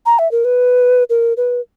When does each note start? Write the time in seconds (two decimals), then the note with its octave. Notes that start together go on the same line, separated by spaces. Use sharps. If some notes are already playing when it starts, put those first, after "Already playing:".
0.06 A#5
0.19 E5
0.31 A#4
0.45 B4
1.10 A#4
1.37 B4